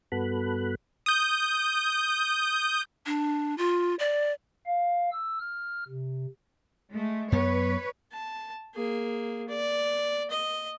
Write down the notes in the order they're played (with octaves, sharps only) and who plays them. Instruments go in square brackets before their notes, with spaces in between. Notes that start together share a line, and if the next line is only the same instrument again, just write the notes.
[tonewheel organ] G2 B3 F#4 A4 B5 F#6
[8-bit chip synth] D#6 G6
[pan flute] D4
F4
D5
[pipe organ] F5
E6
F6
C3
[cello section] G#3 A3
[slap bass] F#2 B3 [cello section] B4 C#5
[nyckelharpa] A5
A#3 G#4
D5
D#5